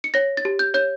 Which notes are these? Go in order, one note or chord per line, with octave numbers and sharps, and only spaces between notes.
C#7
C#5 A#6
A6
G4
G6
C#5 G6